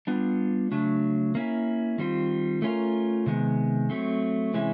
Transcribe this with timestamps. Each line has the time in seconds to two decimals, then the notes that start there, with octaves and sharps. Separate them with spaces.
0.07 G3 B3 D4 F4
0.72 C#3 F#3 A3 D4
1.35 A#3 C#4 E4
1.98 D#3 G3 C4 F4
2.62 A3 C#4 F4 A#4
3.26 C3 D#3 G#3 B3
3.90 F#3 A3 C4
4.54 C3 E3 G#3 C#4 E4